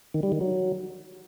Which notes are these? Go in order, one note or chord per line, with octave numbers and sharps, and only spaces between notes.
D#3
G3
D#3
F#3